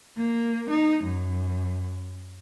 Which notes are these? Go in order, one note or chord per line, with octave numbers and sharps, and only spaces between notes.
A#3
D#4
F#2